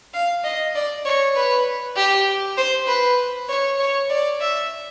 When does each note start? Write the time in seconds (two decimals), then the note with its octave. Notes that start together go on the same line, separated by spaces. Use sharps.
0.14 F5
0.44 D#5
0.75 D5
1.06 C#5
1.36 B4
1.96 G4
2.58 C5
2.88 B4
3.49 C#5
3.79 C#5
4.10 D5
4.41 E5